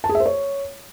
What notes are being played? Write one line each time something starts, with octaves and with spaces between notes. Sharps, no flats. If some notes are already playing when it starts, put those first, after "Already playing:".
A5
G#4
E5
C5
C#5